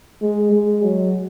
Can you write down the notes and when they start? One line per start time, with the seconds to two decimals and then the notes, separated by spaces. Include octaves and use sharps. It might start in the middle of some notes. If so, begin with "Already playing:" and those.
0.22 G#3
0.52 G#3
0.83 F#3